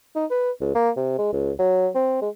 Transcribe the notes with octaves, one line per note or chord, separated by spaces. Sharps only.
D#4
B4
C#2
A#3
C3
G#3
C#2
F#3
C4
G#3